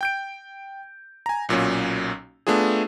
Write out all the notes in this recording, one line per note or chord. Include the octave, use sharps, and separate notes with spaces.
G5 G6 D7
G#5 A#5
B1 A#2 F#3 C#4
A3 B3 D4 F4 G#4